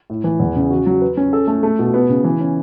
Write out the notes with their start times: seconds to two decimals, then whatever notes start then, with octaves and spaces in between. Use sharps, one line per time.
0.10 A2
0.24 E3
0.40 E2
0.56 C#3
0.70 F#4
0.86 F#3
1.02 B4
1.17 C#4
1.33 A4
1.47 A3
1.63 A3
1.79 B2
1.94 B3
2.09 C#3
2.24 E3
2.40 C#4